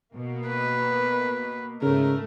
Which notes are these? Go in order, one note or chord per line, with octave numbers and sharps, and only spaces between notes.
B2 A#3
B4
G#2 C#3 A3 A#4